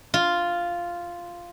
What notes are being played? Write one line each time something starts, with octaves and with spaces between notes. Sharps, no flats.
F4